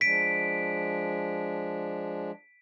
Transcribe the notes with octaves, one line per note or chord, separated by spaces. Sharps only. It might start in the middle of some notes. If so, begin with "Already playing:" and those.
F3 G#3 D4 B6 D7